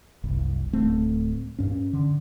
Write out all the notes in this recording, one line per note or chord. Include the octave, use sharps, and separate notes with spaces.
F#1 C2
D1 A3 C4
G2 C#4
D3